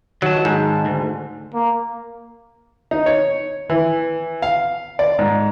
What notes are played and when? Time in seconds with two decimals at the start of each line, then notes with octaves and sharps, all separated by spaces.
0.22 D#3 F#3 A5
0.45 G#2
0.85 D2
1.54 A#3
2.91 D#4
3.06 C#5
3.70 E3
4.42 F5
4.99 D5
5.19 G#2